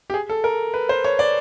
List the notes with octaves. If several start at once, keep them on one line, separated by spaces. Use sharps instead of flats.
G4
G#4
A4
A#4
B4
C5
C#5
D5